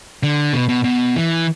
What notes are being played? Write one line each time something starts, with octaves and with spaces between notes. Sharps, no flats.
D3
B2
B2
B2
E3